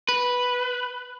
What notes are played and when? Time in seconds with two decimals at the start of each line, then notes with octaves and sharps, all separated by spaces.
0.09 B4